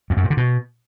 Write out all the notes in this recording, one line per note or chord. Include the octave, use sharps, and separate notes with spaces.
F2
F#2
A#2
D3
B2